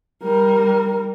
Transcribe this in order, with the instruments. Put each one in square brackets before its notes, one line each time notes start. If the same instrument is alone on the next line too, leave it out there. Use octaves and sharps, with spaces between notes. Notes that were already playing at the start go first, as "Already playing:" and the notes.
[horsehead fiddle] G3 A#4